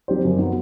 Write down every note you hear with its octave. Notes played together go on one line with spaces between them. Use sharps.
F#3 C4 G4 C5
F#2
F#3 B3